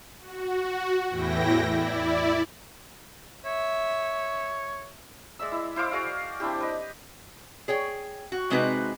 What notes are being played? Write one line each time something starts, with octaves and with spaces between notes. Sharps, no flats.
F#4
E2 A2 E3 E4 G5 A#6
E4 D5
C#5 E5
G#3 D5 E5 E6
E4
E4 C5 F5 D6
F#4 G#4 D5 F5
C4 D4 E4 G4
B4 D#5
G#4 C#5 G5
F#4
C3 G#3 C4 D#4 F#4 B4